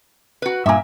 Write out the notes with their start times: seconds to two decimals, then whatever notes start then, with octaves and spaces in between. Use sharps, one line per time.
0.42 F#4 B4
0.66 G2 A#2 A#3 E5 G#5